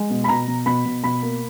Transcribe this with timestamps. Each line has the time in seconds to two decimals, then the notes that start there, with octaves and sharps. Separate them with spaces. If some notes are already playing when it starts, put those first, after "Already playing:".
Already playing: G#3
0.10 B2
0.24 B5
0.28 B2 A#5
0.47 B2
0.66 B2 B5
0.85 B2
1.04 B2 B5
1.22 A#3